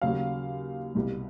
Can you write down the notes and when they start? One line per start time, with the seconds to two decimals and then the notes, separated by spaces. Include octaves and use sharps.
0.02 D#2 C#3 F#3 F5
0.95 C2 B2 G3